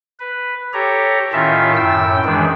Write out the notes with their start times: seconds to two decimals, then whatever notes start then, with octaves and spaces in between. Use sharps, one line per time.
0.19 B4
0.73 G4 A4 C#5 A#5
1.33 A2 D#3 C#4 F4 E5 A5
1.77 F#2 A2 G5 E6
2.25 F#2 D#3 E3 G#3 D4